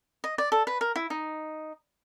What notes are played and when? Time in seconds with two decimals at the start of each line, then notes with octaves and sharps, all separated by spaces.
0.24 D#5
0.38 D5
0.52 A4
0.67 B4
0.81 A#4
0.96 E4
1.10 D#4